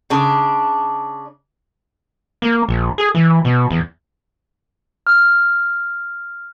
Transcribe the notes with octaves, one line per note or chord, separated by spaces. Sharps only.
C#3 D4
A#3
A#1
G#4
E3
B2
E2
F6